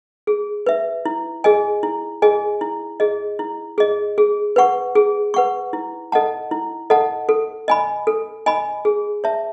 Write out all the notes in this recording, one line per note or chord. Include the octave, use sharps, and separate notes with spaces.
G#4
B4 E5
E4
G#4 D#5 G#5
E4
G#4 D#5 G#5
E4
G#4 D#5
E4
G#4 D#5
G#4
B4 F#5 C#6
G#4
B4 F#5 C#6
E4
A4 D#5 F#5 A5
E4
A4 D#5 F#5 A5
A4
D#5 G#5 B5
A4
D#5 G#5 B5
G#4
C#5 E5 A5